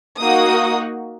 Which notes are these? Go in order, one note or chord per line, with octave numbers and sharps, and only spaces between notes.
A#3 D#4 F#4 D#6